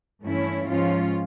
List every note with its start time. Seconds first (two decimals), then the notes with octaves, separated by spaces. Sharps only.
0.23 G2 E3 A3 C#4 E4
0.66 G#2 F3 G#3 C#4 F4